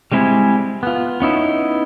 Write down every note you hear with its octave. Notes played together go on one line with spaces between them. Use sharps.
G3 G#3 C4 E4 G#4
B3 F4
B3 C#4 D#4 E4